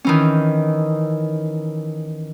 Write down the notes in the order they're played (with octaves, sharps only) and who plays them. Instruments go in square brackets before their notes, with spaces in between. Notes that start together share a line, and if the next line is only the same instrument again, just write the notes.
[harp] D#3 E3 C#4